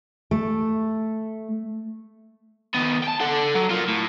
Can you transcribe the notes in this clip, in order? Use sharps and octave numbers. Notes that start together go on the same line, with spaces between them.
A3
D#3 B3
G5 A5
A4 F#5
F#3
F4 A#4
A2